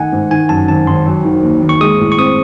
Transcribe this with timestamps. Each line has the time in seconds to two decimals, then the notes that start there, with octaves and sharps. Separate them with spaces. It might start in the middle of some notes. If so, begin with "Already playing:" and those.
Already playing: D#3 A3 D#4 F#5 G#5
0.12 G#2
0.31 D#3 G#5
0.49 F#2 A5
0.68 G#1 A5
0.87 G#1 C6
1.06 F#3
1.24 D#3
1.43 D#2
1.62 D#2
1.69 C#6
1.81 G#3 D#6
1.99 A2
2.12 C#6
2.18 C4 D#6